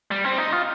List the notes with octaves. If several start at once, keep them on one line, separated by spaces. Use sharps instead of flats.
G3
C4
D#4
F4